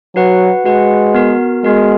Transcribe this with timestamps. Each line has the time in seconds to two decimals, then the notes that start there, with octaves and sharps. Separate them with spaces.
0.15 F#3 F#4 B4 F#5
0.65 G#3 F#4 B4 F#5
1.14 B3 F#4 A#4
1.64 G#3 B3 F#4 A#4